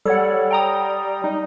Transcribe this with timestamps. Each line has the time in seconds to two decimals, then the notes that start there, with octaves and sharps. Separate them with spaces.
0.05 G3 A4 C#5 F#5
0.51 G5 A#5 D#6
1.24 D#4